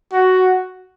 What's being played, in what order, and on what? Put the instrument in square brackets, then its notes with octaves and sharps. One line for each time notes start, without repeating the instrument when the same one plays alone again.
[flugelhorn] F#4